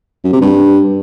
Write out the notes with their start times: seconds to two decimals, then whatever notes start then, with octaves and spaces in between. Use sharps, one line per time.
0.24 F#2
0.32 C3
0.41 G2